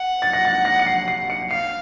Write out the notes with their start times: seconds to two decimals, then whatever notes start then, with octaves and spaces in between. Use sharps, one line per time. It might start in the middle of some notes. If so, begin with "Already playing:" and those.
Already playing: F#5
0.22 A6
0.33 A#6
0.45 A6
0.65 A#6
0.79 C#7
0.86 C7
1.08 C7
1.30 C#7
1.51 F5 C7